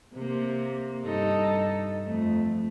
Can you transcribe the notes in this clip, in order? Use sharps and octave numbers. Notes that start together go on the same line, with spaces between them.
C3 A#3
G2 D#4 A4
F2 A3